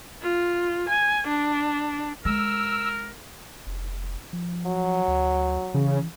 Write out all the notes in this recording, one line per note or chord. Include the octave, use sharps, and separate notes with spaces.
F4
G#5
D4
G#3 A#4 E6
F1
F3
F#3
D2
C#3 E3